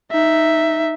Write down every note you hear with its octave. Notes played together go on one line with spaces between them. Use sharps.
D#4 E5